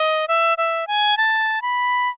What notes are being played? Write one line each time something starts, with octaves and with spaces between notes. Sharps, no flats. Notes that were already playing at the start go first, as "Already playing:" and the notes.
Already playing: D#5
E5
E5
G#5
A5
B5